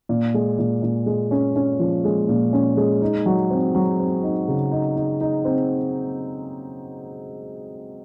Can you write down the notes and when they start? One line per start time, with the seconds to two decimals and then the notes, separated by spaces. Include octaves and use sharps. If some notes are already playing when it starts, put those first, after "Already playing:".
0.09 A#2
0.34 G#3
0.59 A#2
0.83 A#2
1.06 G#3
1.31 C#4
1.56 C#4
1.79 F3
2.05 G#3
2.29 A#2
2.53 C#4
2.77 G#3
3.02 D#4
3.26 F#3
3.50 C4
3.75 F#3
4.00 C4
4.23 D#4
4.48 C#3
4.71 D#4
4.96 D#4
5.21 D#4
5.45 C4